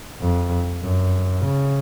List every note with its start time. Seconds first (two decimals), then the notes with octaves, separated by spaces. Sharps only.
0.21 F2
0.82 F#2
1.43 C#3